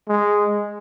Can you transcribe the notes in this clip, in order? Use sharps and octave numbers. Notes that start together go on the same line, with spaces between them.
G#3